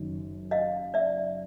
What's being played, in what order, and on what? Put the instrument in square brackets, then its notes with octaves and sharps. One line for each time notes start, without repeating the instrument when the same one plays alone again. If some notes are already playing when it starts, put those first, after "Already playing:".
Already playing: [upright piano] F#1 F#2 D#3
[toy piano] D#5 F5
D5 E5